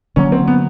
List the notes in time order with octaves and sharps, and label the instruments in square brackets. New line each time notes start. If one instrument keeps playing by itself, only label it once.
[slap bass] D3 F#3 A#3 [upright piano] C#4
[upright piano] C4
B3